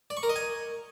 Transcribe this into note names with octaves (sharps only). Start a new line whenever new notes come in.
D5
C#6
A#4
D#5
G#5